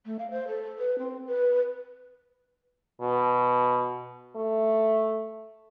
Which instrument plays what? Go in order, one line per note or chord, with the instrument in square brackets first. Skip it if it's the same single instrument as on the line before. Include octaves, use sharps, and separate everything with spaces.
[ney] A3
F5
C5
A4
B4
C4
B4
[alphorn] B2
A3